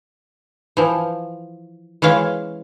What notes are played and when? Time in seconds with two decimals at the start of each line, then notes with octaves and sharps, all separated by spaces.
0.77 E3 F3
2.02 E3 G#3 C#4 F5